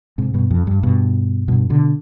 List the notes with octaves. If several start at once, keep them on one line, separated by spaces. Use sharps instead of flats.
G#2 C3
G2 B2
F2
G2
G2 B2
G2 B2
B2 D3